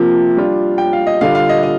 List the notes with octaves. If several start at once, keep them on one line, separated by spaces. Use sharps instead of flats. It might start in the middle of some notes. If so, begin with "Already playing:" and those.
Already playing: C3 F3 A#3
G3 D4 F4
G5
F5
D#5
D3 G3 D4 F4 F5
F5
D#5
D#5